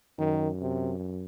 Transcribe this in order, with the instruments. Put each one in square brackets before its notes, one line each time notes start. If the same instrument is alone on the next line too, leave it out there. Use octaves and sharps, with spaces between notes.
[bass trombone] F#2 [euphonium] D#3
[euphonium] C3